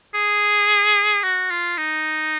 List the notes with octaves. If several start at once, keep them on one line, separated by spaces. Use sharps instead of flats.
G#4
F#4
F4
D#4